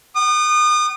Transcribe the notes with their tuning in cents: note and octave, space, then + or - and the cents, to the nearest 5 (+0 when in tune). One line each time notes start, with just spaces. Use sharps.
F#5 +40 D#6 -35